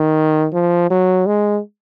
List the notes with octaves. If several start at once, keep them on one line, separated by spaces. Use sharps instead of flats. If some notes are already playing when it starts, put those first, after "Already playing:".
Already playing: D#3
F3
F#3
G#3